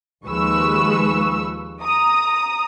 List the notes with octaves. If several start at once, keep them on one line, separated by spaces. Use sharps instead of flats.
D#2 F3 G#3 B4 C#6 E6
A#5 D#6